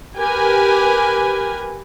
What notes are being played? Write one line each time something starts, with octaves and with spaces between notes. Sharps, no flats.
G4 A#4 B4 G#5